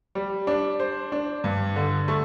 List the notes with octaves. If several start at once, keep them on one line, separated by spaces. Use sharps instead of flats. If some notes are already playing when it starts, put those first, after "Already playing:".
G3
D4
C5
D4
G2
D3
A3